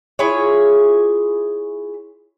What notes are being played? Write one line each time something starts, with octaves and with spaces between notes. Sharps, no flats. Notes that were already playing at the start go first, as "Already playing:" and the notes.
E4 F4 G#4 C#5